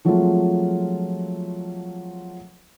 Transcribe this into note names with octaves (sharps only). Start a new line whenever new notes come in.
F3 F#3 G#3 A3 C4 F4